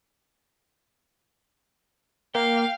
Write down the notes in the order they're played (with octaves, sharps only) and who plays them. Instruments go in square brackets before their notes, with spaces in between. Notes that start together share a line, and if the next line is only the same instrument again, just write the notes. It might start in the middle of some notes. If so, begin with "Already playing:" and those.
[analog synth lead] A#3 [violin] F5 [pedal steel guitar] G5